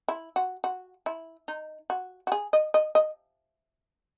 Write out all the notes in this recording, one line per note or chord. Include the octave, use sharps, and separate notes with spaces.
E4
F#4
F#4
E4
D#4
F#4
F#4
G#4
D#5
D#5
D#5